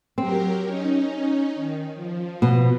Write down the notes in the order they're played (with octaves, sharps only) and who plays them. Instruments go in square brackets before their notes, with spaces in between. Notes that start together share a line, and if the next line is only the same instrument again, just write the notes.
[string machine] F#3 G4 A#4 [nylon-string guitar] C4
[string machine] C#4 D#4
D#3
F3
[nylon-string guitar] B2